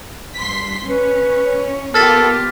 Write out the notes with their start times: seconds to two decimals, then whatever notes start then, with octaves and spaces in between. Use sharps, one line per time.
0.37 G2 C6 B6
0.88 C#4 B4 C#5
1.94 B3 F4 G4 A4 A#4 F6 A6 B6